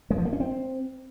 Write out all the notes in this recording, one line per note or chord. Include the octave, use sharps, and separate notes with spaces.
G#3
F3
A#3
C#4
C4